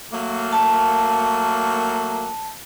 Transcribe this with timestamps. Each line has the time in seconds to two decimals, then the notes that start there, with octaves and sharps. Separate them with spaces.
0.13 F#3 A3 A#3
0.53 A5